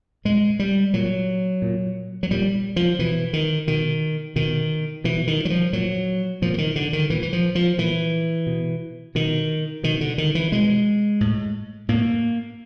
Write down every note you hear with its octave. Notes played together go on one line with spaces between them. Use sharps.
A#2 G#3
G3
A#2 F#3
A#2
F#3
A#2 G3
F3
B2 E3
D#3
B2 D#3
B2 D#3
B2 E3
D#3
F#3
F3
A#2 F#3
A#2 F3
E3
D#3
D3
D#3
A#2 E3
E3
F3
F3
A#2 E3
B2
B2 D#3
B2 D#3
D3
D#3
E3
B2 G#3
A2
A2 A#3